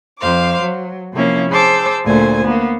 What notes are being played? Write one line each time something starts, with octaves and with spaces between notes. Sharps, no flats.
F2 C5 F5 D6
F#3
C3 F3 A#3 C#4 E4
G#4 C5 A5 D6 E6
D2 A#2 A3 C5 G#5
A#3 B3